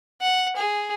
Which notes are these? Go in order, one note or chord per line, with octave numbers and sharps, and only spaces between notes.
F#5
G#4